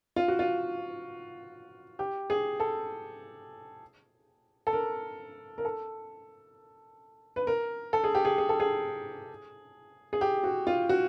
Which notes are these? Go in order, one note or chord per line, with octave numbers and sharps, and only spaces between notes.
F4
F#4
F4
G4
G#4
A4
A4
A#4
A#4
A4
B4
A#4
A4
G#4
G4
G#4
G#4
A4
G#4
G#4
G4
F#4
F4
F#4